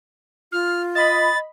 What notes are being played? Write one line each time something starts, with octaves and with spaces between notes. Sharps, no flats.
F4 F6
D#5 B5 A6